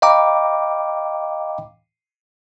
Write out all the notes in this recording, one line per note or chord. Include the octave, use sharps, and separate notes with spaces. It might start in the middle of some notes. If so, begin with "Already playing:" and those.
D#5 F5 G5 A#5 B5 D6